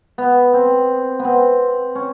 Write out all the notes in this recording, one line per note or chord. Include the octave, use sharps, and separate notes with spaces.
B3
C4
B3
C4
C#4